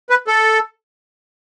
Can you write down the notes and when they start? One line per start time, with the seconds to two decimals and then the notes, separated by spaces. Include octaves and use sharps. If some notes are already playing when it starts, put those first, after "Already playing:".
0.10 B4
0.28 A4